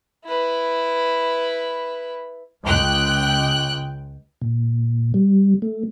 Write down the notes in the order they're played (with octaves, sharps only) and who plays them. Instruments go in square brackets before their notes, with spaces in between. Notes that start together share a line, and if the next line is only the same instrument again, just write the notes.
[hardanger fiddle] E4 B4
[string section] C#2 G5 F#6
[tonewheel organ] A#2
G3
A3